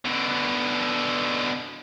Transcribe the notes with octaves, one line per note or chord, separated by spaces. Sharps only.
B2 D3